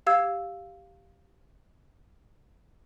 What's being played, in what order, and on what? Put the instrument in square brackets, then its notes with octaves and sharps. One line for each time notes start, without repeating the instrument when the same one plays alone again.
[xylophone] G4 F5 E6 G#6